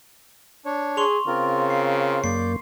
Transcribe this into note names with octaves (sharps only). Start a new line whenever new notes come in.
D4 C#5
G#4 C6 C#6 F7
C#3 C4 F4 A#4
C7
F#2 A#3 D5 G6 C7